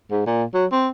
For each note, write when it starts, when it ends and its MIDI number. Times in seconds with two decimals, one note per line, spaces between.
0.11 0.21 44
0.26 0.44 46
0.54 0.66 54
0.72 0.89 60